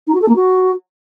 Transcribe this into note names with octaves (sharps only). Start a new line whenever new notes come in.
D#4
F#4
A4
A#3
F#4